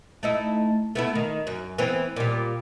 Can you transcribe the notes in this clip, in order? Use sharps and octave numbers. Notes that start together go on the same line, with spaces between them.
A3 D#4 E4
A3 B3 E4
D#3
F#2
E3 B3 C4
A#2 G3